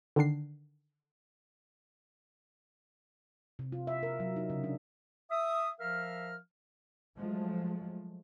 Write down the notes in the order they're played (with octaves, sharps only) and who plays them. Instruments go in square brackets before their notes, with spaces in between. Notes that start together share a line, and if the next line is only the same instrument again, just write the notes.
[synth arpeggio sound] D3 D#3 D4 C7
[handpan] C3
F4
E5
A#4
F#3
D#4
C#3
D4
[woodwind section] E5 D#6
F3 A#4 E5 F5 F6
[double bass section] F3 F#3 G#3 A3